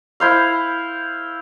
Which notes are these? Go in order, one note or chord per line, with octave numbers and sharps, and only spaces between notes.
E4 C5 F5